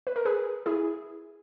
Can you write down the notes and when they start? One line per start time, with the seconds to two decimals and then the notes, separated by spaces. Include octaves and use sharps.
0.07 B4
0.16 A#4
0.25 G#4 B4
0.66 E4 G#4